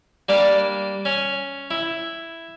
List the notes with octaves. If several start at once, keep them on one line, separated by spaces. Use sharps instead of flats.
G3 A#3 D4
C#4
E4